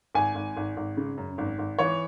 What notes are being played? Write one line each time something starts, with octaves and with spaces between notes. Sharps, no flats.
G#1 G#5
G#1
G#1
G#1
C#3
F#2
G#1
G#1
E3 C#5